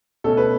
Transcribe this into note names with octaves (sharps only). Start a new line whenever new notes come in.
B2 A3 C#4 A4
B4